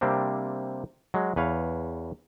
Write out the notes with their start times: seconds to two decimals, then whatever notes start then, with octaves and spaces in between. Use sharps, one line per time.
0.01 C3 G3 A#3 C4 D4
1.14 F#3 G#3
1.36 E2 B4 C#5 F5